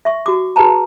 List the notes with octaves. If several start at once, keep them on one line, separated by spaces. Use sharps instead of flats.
E5 C#6
F#4 D6
F#4 G#4 B4 A5 A#5